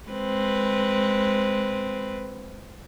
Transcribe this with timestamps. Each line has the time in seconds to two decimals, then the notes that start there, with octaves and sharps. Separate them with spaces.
0.10 G#3 C4 B4